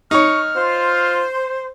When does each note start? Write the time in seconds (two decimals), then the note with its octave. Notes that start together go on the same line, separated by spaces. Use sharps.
0.11 D#4 C#5 C#6 F6
0.56 F4 C5